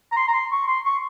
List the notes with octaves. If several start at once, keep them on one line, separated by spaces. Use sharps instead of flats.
A#5
C6
A#5
C6
C#6
C6
C#6